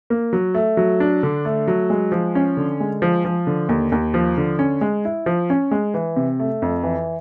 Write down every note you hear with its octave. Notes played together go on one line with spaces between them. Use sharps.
A#3
F#3
A3
F#3
D4
D3
A3
F#3
G#3
F3
C#4
D3
G#3
F3
F3
D3
D#2
D#2
F3
D3
C#4
G#3
E4
F3
C#4
G#3
E3
C3
A3
F2
E3